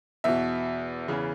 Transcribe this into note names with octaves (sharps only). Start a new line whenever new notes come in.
E2 B2 E5
E2 C#3 E3